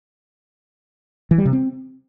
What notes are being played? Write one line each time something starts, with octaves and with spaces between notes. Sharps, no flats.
E3
G3
C3
C4